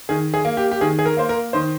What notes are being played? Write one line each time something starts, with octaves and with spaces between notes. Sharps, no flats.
D#3 G#4
G#4
A#3
G4
G4
D#3 G#4
G#4
A#4
A#3 C5
A#4
D#3 C5